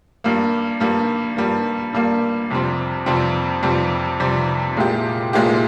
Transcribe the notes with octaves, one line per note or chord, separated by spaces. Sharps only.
G2 G3 A#3
G2 G3 A#3
G2 G3 A#3
G2 G3 A#3
F2 C3 G3 C4
F2 C3 G3 C4
F2 C3 G3 C4
F2 C3 G3 C4
A#2 G#3 E4 G4
A#2 G#3 E4 G4